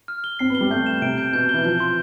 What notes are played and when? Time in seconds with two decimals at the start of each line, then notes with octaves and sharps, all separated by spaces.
0.08 F6
0.24 G7
0.39 C4 C7
0.50 B3
0.55 G7
0.61 G3
0.70 A3 G6
0.86 E7
1.02 C3 D7
1.18 G6
1.33 B2 G6
1.49 E3 G7
1.64 F3 G6
1.80 C6